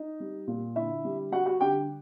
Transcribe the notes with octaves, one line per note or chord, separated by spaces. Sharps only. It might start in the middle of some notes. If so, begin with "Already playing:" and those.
Already playing: D#4
G3
A#2
D3 E4 E5
G3
G3 F#4 F#5
F#4 F#5
D3 G4 G5